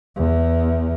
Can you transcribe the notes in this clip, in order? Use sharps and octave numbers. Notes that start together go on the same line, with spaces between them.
E2